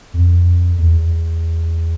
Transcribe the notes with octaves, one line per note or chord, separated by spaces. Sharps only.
F2
E2